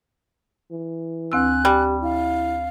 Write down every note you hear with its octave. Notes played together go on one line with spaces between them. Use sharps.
E3
D2 C4 G#5 E6 F#6
G3 G4
E4 F5